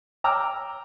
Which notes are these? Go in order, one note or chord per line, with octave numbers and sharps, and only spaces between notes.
G5 A#5 D6 E6 F6